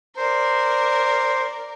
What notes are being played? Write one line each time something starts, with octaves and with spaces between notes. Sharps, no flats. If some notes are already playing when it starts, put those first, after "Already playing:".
A#4 C5 D5